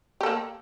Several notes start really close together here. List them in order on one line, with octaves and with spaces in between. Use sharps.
G4 A4 A#3